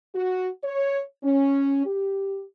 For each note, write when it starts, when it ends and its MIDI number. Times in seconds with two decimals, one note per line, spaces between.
0.15 0.49 66
0.64 1.01 73
1.24 1.83 61
1.86 2.43 67